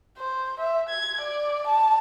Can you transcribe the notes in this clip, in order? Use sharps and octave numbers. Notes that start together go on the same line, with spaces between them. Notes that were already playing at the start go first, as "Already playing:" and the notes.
C5
E5
G#6
D5
A5